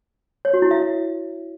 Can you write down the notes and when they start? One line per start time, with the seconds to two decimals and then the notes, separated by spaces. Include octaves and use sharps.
0.45 C#5
0.54 F#4
0.62 E4
0.71 E5